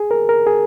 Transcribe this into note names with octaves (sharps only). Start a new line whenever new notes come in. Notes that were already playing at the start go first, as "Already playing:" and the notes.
Already playing: G#4
A#4
A#4
G#4